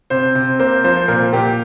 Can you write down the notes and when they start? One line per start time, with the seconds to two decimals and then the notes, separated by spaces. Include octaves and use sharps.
0.10 C3 C5
0.35 C3
0.60 A#3 C5
0.84 F3 C5
1.08 A#2 A#4
1.33 A#2 G4